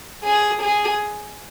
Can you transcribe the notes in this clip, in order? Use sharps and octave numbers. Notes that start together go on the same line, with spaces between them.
G#4
G#4